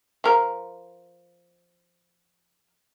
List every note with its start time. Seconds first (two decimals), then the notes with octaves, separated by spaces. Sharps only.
0.24 F3 A#4